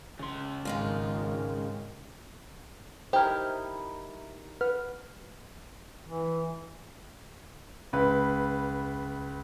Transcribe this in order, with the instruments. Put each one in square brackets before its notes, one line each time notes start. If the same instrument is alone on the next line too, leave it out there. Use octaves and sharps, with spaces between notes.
[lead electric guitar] C#3 C6
[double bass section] G#1 [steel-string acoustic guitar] D#3 G#3 F4
[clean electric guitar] D#4 E4 A#4 [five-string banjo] G4 [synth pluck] C5
[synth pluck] B4 F#5 F6
[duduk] E3
[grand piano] C#2 B4